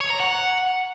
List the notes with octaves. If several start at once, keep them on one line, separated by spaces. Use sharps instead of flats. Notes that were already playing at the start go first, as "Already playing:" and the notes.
C#5
A#5
F#5